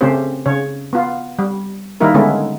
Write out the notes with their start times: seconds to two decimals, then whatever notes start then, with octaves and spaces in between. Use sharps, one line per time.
0.01 C#3 A3 C4 C#4 G4 C5
0.46 C#3 C#5
0.93 B3 F4
1.39 G3
2.00 D#3 G3 A#3 D#4 E4 A#4
2.14 D3 G#3 A3 B3 C#4 E4